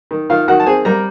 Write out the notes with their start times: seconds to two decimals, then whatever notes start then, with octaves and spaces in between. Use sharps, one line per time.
0.11 D#3
0.30 D#3 F4 F5
0.48 D#3 F#4 F#5
0.60 A5
0.66 C4 G#4 G#5
0.85 G3 A#4 A#5